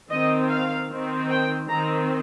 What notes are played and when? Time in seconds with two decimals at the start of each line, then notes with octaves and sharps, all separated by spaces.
0.10 D#3 C4 D#5
0.50 F5
0.90 D#3 C4
1.30 G5
1.69 D#3 C4 A#5